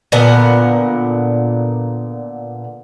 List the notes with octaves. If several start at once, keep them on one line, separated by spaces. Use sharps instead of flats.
A#2 D3 B3 A#4